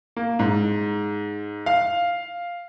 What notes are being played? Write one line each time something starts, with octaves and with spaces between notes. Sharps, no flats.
A#3
G#2
F5